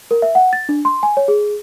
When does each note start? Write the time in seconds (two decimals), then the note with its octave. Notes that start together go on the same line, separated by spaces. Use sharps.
0.11 A#4
0.22 E5
0.35 F#5
0.53 A6
0.69 D4
0.85 C6
1.03 G#5
1.17 C#5
1.28 G#4